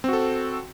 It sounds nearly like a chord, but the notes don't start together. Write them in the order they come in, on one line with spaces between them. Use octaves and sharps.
C4 F#4 A4